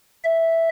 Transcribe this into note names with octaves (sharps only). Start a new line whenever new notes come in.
E5